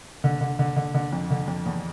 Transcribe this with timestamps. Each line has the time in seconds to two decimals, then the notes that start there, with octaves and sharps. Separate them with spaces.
0.24 D3
0.41 D3
0.59 D3
0.76 D3
0.95 D3
1.13 F2
1.31 D3
1.48 F2
1.66 E2